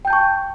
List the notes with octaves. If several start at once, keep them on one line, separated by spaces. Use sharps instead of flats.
G5 A5 C#6 G6